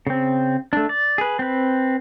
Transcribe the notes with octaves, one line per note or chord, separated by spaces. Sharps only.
C#3 C4
A3 D4
D5
G#4 B4
C4 B4